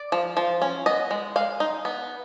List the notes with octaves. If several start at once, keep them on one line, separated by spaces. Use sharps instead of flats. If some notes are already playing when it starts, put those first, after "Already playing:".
Already playing: D5
F3
F3
C#4
B3 D#5
G#3
G#3 F5
D#4
B3